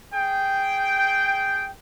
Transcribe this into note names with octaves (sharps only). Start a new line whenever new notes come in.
G#4 G5